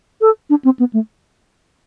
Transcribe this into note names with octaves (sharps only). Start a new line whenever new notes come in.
A4
D4
C4
B3
A3